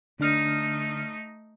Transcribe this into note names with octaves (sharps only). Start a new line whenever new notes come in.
D3 A3 D4 D#4 F6